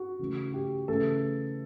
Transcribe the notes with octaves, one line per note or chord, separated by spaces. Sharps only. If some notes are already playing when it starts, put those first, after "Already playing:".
Already playing: F#4
C#3 E3 A3
G4
C#3 E3 A3 A4